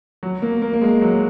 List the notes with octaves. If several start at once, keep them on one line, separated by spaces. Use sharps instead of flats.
F#3
A#3
A#3
A#3
G#3
F#3